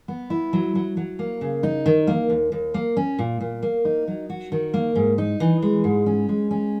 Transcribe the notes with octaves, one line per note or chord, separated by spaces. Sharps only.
B3
E4
F#3
F#3
F#3
A#3
C#3
D#4
D#3
A#3
D#2
D#2
A#3
C#4
A#2
A#2
A#3
D#4
F#3
F#4
D#3
A#3
G#2
D#4
E3
G#3
G#2
C#4
G#3
C#4